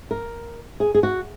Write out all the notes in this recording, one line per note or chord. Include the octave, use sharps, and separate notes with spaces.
A#4
G#4
G#4
F#4